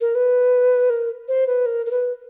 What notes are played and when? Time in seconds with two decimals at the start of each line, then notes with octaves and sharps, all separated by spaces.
0.01 A#4
0.15 B4
0.89 A#4
1.28 C5
1.47 B4
1.66 A#4
1.86 A#4
1.90 B4